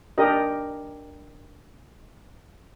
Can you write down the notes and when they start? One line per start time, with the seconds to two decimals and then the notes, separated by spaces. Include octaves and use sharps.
0.18 D4 G4 A#4 D#5